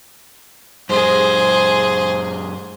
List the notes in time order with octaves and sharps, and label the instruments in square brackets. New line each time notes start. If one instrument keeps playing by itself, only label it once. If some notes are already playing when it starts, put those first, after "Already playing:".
[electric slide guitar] F#2 G#3 [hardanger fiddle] G#4 C5